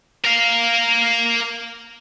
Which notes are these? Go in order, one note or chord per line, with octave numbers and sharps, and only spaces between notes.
A#4 F5